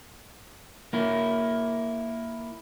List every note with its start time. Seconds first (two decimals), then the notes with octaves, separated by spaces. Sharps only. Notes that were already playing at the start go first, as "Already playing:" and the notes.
0.93 A#3 E4